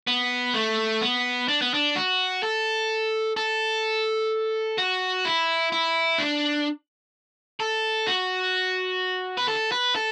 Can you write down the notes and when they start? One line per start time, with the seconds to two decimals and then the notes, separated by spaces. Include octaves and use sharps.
0.07 B3
0.54 A3
1.01 B3
1.48 D4
1.62 B3
1.74 D4
1.96 F#4
2.43 A4
3.37 A4
4.78 F#4
5.25 E4
5.72 E4
6.18 D4
7.60 A4
8.07 F#4
9.38 B4
9.48 A4
9.72 B4
9.95 A4